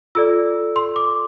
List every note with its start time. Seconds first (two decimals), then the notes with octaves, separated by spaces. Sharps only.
0.15 F4 A4 D5 E6
0.76 C6
0.96 D6